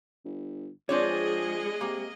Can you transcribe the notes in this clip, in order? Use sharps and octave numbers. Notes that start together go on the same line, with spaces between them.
G1
F3 G#3 C4 D4 G#4 C#5 D#5
C3 A#3